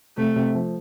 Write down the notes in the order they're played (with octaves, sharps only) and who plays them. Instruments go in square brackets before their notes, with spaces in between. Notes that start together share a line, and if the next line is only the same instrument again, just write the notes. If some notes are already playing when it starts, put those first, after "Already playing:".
[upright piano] C3 [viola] A3
[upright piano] C3
F3